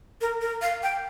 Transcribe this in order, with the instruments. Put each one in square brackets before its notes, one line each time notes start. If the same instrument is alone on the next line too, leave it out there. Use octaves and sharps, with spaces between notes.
[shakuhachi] A#4
A#4
F5
G5